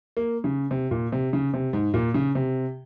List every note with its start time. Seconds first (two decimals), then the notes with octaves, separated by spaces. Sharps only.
0.17 A#3
0.44 C#3
0.71 C3
0.91 A#2
1.12 C3
1.33 C#3
1.54 C3
1.73 G#2
1.94 A#2
2.14 C#3
2.35 C3